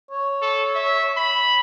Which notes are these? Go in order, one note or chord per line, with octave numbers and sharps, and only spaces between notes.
C#5
A4
E5
B5